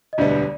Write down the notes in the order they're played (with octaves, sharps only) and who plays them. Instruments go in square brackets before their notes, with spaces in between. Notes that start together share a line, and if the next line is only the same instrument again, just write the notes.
[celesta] D#5
[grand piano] E1 D2 D3 G3 B3 [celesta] D5